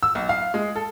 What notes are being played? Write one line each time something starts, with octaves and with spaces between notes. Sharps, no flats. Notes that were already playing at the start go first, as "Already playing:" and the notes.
E6
B1
F5
G#3
A4